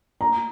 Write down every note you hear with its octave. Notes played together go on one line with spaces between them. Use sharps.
A#5